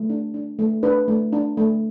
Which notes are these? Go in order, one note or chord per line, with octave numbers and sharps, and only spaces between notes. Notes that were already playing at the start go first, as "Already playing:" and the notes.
Already playing: A3
D4
D4
A3
D4 B4
A3
D4
A3